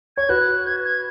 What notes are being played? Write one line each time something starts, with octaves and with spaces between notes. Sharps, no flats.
C#5 G#6
F#4 B4 F#6
G#6
G#6